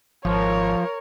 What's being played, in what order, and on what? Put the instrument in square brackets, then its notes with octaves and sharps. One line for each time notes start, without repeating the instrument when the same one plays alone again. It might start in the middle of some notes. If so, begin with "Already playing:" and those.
[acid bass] G#1 [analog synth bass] F3 [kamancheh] A#4 C#5